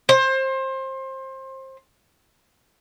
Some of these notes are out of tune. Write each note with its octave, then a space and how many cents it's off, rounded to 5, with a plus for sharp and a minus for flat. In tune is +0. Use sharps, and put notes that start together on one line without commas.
C5 +25